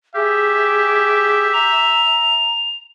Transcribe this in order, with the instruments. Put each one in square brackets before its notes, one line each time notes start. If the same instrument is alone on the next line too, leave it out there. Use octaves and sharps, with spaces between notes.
[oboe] G4 [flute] G#4 [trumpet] E5
[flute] A#5 [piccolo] F7